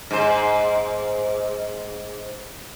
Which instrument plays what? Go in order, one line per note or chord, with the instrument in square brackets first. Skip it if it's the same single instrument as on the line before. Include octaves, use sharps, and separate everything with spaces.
[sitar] G#2 C5